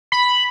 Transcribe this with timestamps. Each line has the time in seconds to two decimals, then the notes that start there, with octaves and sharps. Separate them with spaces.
0.12 B5